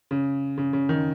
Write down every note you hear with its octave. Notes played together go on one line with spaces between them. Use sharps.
C#3
C#3
C#3
D#3